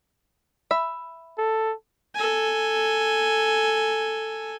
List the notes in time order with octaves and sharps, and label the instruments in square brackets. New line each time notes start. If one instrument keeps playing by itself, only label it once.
[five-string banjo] E5 B5
[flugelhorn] A4
[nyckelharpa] A4 G#5